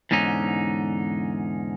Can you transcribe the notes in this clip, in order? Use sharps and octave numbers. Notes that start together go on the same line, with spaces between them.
E2 G#2 D3 C#4 D#4